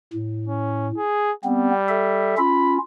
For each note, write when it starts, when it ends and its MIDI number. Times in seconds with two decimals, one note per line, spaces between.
0.13 0.92 45
0.48 0.88 61
0.97 1.32 68
1.44 2.36 55
1.44 1.71 59
1.44 1.71 60
1.88 2.38 69
1.88 2.38 76
2.38 2.78 61
2.38 2.78 65
2.38 2.79 83